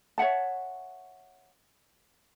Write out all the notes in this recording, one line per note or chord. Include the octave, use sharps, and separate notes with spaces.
C#5 E5 F#5 A5